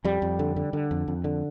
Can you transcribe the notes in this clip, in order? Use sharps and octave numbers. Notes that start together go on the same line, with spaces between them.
F2 G3
F2
D3
D3
D3
F2
F2
D3